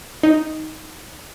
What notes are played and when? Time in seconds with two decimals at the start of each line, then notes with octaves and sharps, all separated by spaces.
0.23 D#4